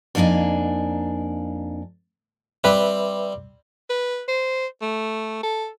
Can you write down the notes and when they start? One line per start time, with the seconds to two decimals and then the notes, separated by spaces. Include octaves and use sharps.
0.15 F2 A#3 D4 D#4 G#5
2.64 G3 C4 B4 E5
3.90 B4
4.28 C5
4.82 A3
5.43 A4